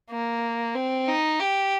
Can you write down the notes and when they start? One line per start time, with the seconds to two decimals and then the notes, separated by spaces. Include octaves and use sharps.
0.11 A#3
0.75 C4
1.08 D#4
1.40 G4